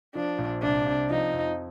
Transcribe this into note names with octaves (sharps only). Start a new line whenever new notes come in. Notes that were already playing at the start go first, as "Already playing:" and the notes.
F3 D4
A#1
C2 D4
C3
F3 D#4
F2